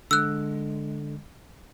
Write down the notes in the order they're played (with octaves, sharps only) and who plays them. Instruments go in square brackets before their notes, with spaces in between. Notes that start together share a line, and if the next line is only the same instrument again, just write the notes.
[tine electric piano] D3 [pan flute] G#3 [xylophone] E6 F#6